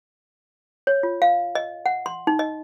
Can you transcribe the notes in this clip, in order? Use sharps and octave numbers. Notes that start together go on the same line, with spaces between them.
C#5
F4
F5
D#5
F#5
C6
D#4
D#5